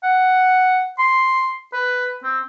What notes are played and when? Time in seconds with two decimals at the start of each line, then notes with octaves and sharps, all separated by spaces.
0.03 F#5
0.98 C6
1.73 B4
2.23 C4